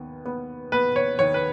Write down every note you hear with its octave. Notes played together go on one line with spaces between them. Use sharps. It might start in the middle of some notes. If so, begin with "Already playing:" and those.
Already playing: D#2 B3
B3
B3 B4
C#5
D#2 C#5
B4